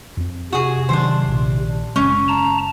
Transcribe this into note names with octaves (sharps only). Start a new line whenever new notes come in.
F2 C4
C3 F#4 G#4
F1 D#3 F#3 D4 C5
A#1 A#2 D#3
F#1 C#3 G#3 C#4
A5 A#5